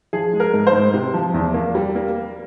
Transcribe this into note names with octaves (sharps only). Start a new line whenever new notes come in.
F3 G#4
G#3
A#4
G#2
C5
G#2
C3
F3
E2
A#3
G3
A#3